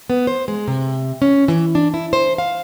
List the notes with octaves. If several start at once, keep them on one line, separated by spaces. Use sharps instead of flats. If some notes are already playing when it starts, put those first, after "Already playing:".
B3
C5
G#3
C3
C#4
E3
D4
E4
C5
F5